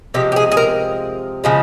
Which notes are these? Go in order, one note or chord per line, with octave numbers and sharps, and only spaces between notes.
C3 F3 G#3 G4
G4
G#4
G#4
A#4
C#3 F3 G#3